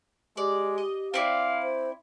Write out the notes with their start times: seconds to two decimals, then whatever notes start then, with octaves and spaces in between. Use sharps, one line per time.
0.37 G#3 G4 D5
0.78 D#5
1.14 C4 E4 D5 F5
1.63 C5